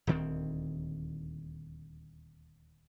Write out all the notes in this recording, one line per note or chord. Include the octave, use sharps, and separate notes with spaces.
D#1 D2 D#3 C4